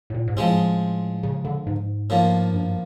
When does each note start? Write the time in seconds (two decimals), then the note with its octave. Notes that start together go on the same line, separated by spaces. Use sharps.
0.10 A2
0.14 A#2
0.27 G#2
0.36 A2 F3 G#3 C4
1.23 C#3
1.45 D3
1.67 G#2
2.10 A2 F3 A#3
2.53 G2